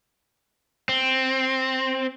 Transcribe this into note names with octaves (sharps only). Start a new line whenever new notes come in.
C4